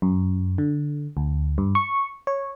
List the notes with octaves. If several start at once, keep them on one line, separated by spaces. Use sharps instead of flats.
F#2
D3
D2
G2
C#6
C#5